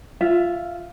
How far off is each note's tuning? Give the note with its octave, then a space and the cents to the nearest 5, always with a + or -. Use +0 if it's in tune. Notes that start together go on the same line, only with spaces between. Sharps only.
F4 +0 E5 +15